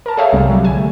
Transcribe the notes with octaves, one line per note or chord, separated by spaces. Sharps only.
A#4 A5
G#4 A4 C#5 E5 F5 G5
C2 C3 G3
F#3 G3
D3 G#5
A3